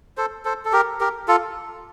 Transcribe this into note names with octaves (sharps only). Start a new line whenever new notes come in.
A4 C5
A4 C5
A4
G4 A#4
G4 A#4
F4 A4